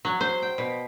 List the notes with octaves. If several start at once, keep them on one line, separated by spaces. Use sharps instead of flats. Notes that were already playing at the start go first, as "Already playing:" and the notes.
F#3
C5
G5
B2